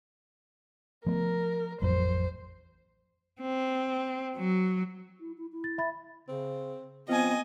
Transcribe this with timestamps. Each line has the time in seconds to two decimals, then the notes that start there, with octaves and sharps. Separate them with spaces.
1.06 F3 A3 B3 A#4
1.82 A1 F2 F#3 C5
3.42 C4
4.36 F#3
5.20 E4
5.38 E4
5.52 E4
5.64 A6
5.78 E5 B5 A6
6.29 C#3 C4
7.09 F3 B3 C4 D#5 G#5